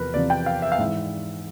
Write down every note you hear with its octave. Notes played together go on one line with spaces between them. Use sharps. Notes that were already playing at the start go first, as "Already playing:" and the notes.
Already playing: E2 C3 F3 A#4 B4
E2 C3 F3 D5
G5
F5
E5
F5
G#2 E3 E5